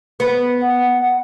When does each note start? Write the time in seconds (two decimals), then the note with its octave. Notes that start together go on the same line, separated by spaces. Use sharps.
0.20 B3
0.62 F#5